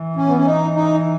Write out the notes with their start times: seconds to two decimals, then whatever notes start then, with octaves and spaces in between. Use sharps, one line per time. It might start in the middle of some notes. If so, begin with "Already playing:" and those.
Already playing: E3
0.16 C#4
0.27 B3
0.37 C#4
0.46 D#4
0.75 D#4